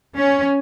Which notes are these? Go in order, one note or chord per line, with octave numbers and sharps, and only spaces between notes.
C#4